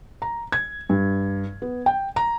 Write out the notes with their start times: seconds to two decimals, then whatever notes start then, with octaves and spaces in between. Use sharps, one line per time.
0.22 A#5
0.52 G#6
0.89 G2
1.62 B3
1.86 G5
2.16 A#5